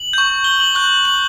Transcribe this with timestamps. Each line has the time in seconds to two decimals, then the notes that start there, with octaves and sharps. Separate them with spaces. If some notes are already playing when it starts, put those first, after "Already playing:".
Already playing: F#7
0.13 C#6 G6
0.44 G7
0.60 F#7
0.75 C#6 F#6
1.05 F#7